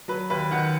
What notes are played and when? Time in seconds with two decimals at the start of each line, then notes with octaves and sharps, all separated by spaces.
0.08 F#3 B4
0.30 D#2 B4
0.51 D#3 F#5